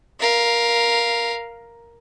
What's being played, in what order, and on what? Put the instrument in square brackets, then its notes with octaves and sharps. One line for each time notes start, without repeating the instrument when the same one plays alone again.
[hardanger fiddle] A#4 F5